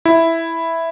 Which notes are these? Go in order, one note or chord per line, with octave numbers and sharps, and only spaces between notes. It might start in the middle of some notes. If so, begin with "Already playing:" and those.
E4